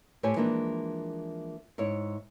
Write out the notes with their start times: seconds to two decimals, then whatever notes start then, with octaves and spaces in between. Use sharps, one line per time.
0.23 A2 G4 C5 C#5 G#5
0.36 E3 F3 G#3 A#3 D4
1.78 G#2 E4 C#5